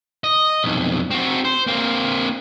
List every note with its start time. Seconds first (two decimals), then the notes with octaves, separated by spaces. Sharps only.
0.24 D#5
0.64 B1 F2
1.11 C4 F#4
1.45 C5
1.67 A#3 C4